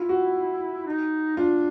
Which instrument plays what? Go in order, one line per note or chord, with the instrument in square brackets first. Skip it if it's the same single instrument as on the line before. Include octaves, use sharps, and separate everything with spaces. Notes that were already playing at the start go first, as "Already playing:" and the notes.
Already playing: [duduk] E4 [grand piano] F4
[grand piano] F#4
[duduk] D#4
[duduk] D4 [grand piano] F4